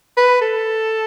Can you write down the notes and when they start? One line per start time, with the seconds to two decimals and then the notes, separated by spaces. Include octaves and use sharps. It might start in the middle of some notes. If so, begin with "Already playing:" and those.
0.17 B4
0.41 A4